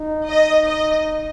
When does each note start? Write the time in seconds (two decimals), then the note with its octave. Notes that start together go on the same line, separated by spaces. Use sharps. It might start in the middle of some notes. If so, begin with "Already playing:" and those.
Already playing: D#4
0.28 D#5
0.66 D#5